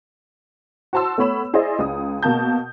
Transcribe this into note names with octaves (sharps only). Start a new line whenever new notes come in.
F#4 C5 A5 C6 E6
A3 B3 C#5 B5 E7
E4 G#4 C5 D5 D#5
C#2 D#6
B2 A#3 A5 G6